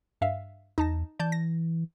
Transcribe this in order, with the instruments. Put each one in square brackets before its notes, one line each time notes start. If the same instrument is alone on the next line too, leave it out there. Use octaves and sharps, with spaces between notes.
[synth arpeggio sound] G2 E5 F5
[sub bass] E2 [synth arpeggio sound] D#4 A5 A#6
[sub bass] E3 [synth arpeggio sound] D5 A5 G6
[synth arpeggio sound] A#6